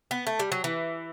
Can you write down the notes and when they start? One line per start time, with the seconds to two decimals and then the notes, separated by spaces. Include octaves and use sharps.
0.11 B3
0.27 A3
0.39 G3
0.52 F#3
0.64 E3